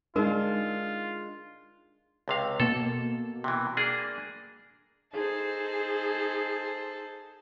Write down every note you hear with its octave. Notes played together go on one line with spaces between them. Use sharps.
G#3 D4 D#4 F4 A#4
C#2 C3 F5
B2 A#3 A4
C3 E3
A#3 D4 G#4
D#4 G#4 A4 C5